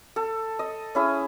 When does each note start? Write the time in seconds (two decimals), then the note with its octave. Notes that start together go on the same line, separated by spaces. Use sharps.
0.16 A4
0.59 D#5
0.95 C#4 E4 G#4